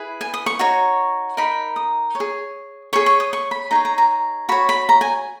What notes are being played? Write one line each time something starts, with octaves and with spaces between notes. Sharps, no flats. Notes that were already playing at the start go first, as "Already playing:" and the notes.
Already playing: E4 G#4 B4
G#5
D#6
C#6
D#4 F#4 C#5
D#4 A#4 D#5 B5
D#6
C#5
G#4
G#4 C#5 C#6
C#6
D#6
C#6
B5
D#4 G#4 C#5 A#5
A#5
A#5
F#4 C#5 B5
B5
A#5
G#5